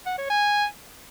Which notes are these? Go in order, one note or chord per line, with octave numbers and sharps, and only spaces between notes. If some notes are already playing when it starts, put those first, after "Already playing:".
F#5
C#5
G#5